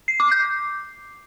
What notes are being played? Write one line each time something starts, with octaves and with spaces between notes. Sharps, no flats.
C7
D6
G6